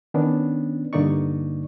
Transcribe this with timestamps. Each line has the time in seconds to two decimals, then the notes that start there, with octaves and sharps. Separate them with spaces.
0.14 D#3 B3 C#4 D4
0.93 G2 D3 A#3 D#4 D5 C#6